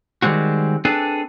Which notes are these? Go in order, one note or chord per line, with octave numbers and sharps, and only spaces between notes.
D#3 G3 G#3 C4 F#4
C4 D4 G#4 A4 B4